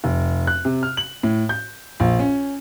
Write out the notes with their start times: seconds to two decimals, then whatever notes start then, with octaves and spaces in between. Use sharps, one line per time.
0.04 F1
0.47 F#6
0.65 C3
0.83 F6
0.97 F#7
1.23 A2
1.49 G6
2.00 A#1
2.19 C#4